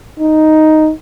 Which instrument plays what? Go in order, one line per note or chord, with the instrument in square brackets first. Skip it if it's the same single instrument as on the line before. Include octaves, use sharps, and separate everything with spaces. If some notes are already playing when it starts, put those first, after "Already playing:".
[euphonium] D#4